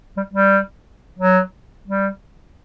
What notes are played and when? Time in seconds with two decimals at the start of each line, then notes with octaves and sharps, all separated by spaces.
0.17 G3
0.33 G3
1.19 F#3
1.88 G3